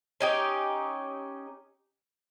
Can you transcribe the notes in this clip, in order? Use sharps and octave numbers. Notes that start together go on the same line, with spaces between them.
C#4 D#4 G4